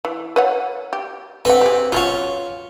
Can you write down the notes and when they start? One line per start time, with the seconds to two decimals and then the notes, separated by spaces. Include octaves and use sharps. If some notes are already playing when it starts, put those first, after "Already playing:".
0.05 E3
0.36 B4 C#5 F#5
0.93 G4
1.45 D3 C4 B4 F#5
1.61 G4 G#4
1.92 F#3 C#4 F4 F#4 C#5